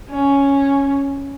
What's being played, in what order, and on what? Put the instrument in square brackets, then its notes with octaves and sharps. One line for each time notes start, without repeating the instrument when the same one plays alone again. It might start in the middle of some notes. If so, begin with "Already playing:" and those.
[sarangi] C#4